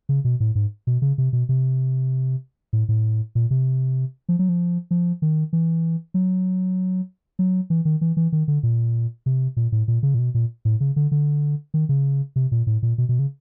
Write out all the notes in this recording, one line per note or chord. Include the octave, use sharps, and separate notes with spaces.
C#3
B2
A2
G#2
B2
C#3
C3
B2
C3
A2
A2
A#2
C3
F3
F#3
F3
F3
D#3
E3
F#3
F#3
E3
D#3
E3
E3
D#3
D3
A#2
C3
A#2
A2
A#2
C#3
A#2
B2
A#2
A2
C#3
D3
D3
D#3
C#3
C3
A#2
A2
A#2
B2
B2
C#3